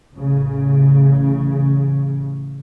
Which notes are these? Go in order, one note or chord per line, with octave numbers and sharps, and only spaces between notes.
A1 C#3